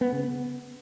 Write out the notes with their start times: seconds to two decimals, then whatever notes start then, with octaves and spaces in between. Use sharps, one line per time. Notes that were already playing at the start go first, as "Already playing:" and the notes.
0.01 B3
0.12 C#3
0.24 B3